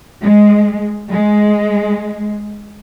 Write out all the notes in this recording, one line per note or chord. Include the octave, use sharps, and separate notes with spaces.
G#3
G#3